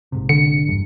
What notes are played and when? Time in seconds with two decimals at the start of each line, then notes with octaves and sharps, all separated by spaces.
0.12 A#1 G#2 C3
0.29 D3 C#7
0.67 G#1 E2 G2